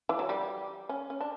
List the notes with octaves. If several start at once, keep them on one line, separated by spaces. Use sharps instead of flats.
E3
F#3
G3
C#4
C#4
D4